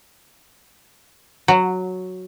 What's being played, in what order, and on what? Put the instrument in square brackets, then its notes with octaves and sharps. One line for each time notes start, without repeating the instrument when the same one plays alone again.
[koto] F#3